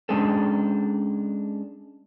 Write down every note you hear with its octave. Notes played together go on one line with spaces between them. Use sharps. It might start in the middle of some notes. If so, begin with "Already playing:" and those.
G#3 C#4 D4 G#4 A4